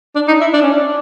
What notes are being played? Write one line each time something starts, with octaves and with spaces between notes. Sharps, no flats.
D4
D#4
E4
D4
C#4
D4